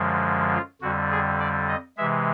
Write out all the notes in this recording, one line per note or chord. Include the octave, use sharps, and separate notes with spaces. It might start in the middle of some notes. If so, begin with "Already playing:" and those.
Already playing: F#2 D3 F3 G#3
F4
F2 D3 G3 F#4
G#4
D5
D#5
C3 E3 G#3 E5